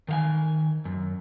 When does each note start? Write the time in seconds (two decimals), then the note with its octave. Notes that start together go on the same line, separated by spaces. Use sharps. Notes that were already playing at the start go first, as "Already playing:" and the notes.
0.08 D#3 F5 G#5
0.85 F#2